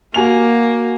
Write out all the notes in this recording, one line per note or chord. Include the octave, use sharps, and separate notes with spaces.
A#3 F#4 G#5 F7